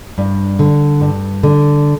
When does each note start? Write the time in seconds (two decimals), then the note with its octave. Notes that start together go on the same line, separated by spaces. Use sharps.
0.18 G2
0.59 D3
1.01 G2
1.43 D3